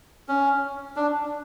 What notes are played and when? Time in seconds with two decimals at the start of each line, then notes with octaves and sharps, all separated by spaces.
0.28 C#4
0.96 D4